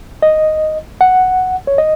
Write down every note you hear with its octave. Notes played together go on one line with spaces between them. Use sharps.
D#5
F#5
C#5
D#5